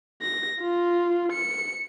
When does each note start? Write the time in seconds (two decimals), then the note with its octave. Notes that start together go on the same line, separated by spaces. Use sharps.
0.22 A#6
0.61 F4
1.32 C#7